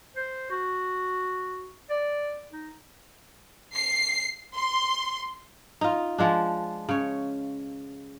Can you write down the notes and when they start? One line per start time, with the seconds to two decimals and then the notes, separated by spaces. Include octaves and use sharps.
0.17 C5
0.51 F#4
1.90 D5
2.51 D#4
3.74 C7
4.54 C6
5.81 D#4 F4
6.18 F3 G#3 D4
6.89 C#3 C#5